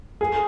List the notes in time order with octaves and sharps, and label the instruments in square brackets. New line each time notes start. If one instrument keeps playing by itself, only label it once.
[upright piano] G#4